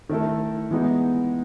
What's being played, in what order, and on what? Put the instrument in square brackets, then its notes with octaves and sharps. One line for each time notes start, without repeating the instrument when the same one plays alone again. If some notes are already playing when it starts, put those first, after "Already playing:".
[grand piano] D#3 A3 E4 A4
E3 G#3 B3 D#4